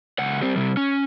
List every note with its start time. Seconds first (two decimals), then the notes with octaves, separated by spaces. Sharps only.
0.19 C#2 F#5
0.41 G3 C4
0.56 C3 G3
0.77 C#4